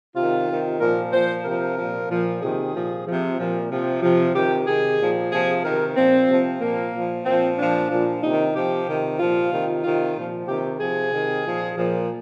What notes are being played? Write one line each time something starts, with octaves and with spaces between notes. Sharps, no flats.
C3 D#3 F4
C3 D#3
A#2 F3 A#4
A#2 F3 C5
C3 F3 A#4
A#2 F3
A#2 F3
C3 D#3 G#4
A#2 F3
C3 F3
A#2 F3
C3 F3
C3 F3
C3 D#3 G4
C3 D#3 G#4
A#2 F3
C3 F3 G#4
C3 D#3 A#4
A#2 F3 C4
C3 F3
A#2 F3 A#3
A#2 F3
A#2 F3 C4
A#2 F3 D4
A#2 F3
C3 D#3 D#4
C3 F3 G4
C3 D#3
A#2 F3 F4
C3 D#3
C3 D#3 F4
A#2 F3
C3 D#3 G4
C3 F3 G#4
C3 D#3
A#2 F3
A#2 F3